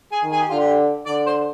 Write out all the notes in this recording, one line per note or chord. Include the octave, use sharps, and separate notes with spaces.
G#4
D#3
G#4
G4
D3 F4
G4
D3 D5
C5